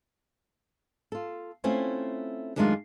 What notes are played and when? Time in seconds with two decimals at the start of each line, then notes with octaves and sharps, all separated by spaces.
1.12 F4 A4
1.64 A3 C4 C#4 E4 F4
2.56 F#2 D#3 G#3 A3 D4 F4